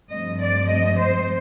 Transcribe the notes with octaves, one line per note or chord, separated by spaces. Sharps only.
G2 F3 A3 C4 D#5
D5
D#5
C5